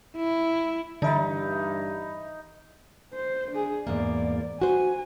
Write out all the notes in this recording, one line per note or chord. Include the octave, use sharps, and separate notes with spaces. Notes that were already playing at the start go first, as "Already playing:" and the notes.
E4
G2 D3 E3 D#4 E5 B5
C5
D4 G#4
E2 G#2 A#3 D5
F#4 C5 G#5